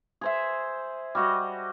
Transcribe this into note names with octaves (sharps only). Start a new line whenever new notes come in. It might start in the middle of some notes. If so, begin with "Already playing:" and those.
G#4 C5 E5
G3 F#4 D#5